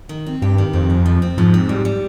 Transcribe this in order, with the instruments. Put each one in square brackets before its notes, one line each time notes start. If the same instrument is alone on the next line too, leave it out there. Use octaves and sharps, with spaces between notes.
[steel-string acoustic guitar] D#3
C4
[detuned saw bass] G2 [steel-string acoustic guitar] G4
[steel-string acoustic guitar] D#3
[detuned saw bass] F2 [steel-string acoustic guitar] C4
[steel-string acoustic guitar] G#3
F3
C4
[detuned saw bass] G#2 [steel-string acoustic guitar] F3
[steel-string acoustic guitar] C4
G3
G3